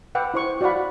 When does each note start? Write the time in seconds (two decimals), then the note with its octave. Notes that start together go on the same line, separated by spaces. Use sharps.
0.15 B4 F#5 G5 D6 E6
0.34 E4 C5 C#6
0.61 F#4 D5 F5 F#5 B5